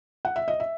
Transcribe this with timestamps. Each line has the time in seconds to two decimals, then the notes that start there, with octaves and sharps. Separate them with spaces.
0.25 F#5
0.36 E5
0.48 D#5
0.60 E5